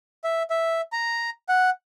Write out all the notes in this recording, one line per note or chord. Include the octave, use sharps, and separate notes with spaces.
E5
E5
A#5
F#5